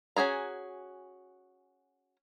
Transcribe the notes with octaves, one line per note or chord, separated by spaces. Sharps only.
C#4 F#4 G#4 A#5